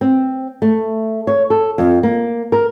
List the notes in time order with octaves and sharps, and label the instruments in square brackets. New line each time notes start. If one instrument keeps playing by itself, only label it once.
[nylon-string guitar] C4
A3
C#5
A4
F2
A#3
A#4